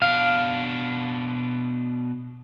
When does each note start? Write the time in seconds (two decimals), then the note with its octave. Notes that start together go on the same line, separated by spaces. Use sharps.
0.02 B2 D4 F5